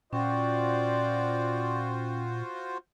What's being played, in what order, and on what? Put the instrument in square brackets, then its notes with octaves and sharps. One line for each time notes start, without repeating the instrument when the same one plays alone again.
[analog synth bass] A#2 [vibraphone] C#4 G5 C#6 [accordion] F4 F#4 C5 [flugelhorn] D5